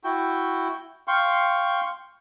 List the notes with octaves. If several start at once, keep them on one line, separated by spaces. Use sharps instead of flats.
E4 F#4 G5
F5 G5 C6 C#6